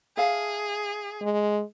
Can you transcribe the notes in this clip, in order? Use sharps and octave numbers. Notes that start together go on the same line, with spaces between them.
G#4 E5 F5 A5
G#3